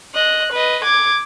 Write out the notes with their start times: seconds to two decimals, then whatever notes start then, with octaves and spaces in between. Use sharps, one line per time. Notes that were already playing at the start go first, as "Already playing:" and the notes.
0.15 D#5 F#6
0.52 B4 D#5
0.84 D6 G#6